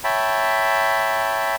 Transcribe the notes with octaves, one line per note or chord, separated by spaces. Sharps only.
C#5 E5 G5 A5 B5